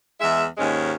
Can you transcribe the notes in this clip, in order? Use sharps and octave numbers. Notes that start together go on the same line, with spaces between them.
E2 G#3 E5
D#2 G#2 G#3 C#4